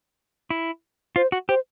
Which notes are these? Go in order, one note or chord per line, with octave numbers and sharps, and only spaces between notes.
E4
F4 C5
F#4
G4 C5